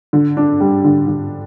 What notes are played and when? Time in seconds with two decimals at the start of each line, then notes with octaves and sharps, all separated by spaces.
0.13 D3
0.37 D4
0.60 G3
0.84 D3
1.08 D3